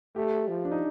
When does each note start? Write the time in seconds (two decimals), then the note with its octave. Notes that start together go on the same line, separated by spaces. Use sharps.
0.16 A3 G4
0.48 F3
0.65 D4
0.71 D#4